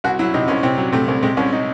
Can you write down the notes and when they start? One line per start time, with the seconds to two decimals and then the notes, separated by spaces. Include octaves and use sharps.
0.04 C2 F#4
0.19 F#3 E4
0.34 C3 D#4
0.48 C2 C#4
0.63 C3 C4
0.78 F#3
0.92 C3 A3
1.08 C2
1.22 C3 G#3
1.37 C2 C#4
1.53 D#4